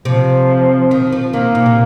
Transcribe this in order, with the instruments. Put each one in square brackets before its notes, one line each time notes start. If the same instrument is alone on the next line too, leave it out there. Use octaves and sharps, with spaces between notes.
[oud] C3 [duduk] F3
[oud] D#3
F3
[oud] D#3 [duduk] A#3
[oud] A#2
C3